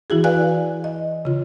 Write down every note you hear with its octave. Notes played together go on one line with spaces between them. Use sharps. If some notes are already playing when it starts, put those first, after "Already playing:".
E3 E4 F#4 G#4
B4 D5 F5 G#5 F#6
D#5
C#3 F4